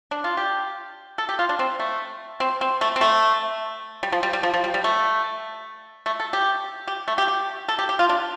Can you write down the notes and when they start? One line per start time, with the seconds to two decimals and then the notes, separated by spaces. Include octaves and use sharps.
0.11 D4
0.24 F4
0.37 G4
1.18 A4
1.29 G4
1.39 F4
1.49 D4
1.59 C4
1.80 A3
2.40 C4
2.61 C4
2.81 A3
2.96 C4
3.01 A3
4.03 G3
4.12 F3
4.23 G3
4.33 G3
4.43 F3
4.54 F3
4.64 G3
4.74 G3
4.84 A3
6.06 A3
6.20 A4
6.33 G4
6.87 G4
7.08 A3
7.18 G4
7.28 G4
7.68 A4
7.79 G4
7.89 G4
7.99 F4
8.09 D4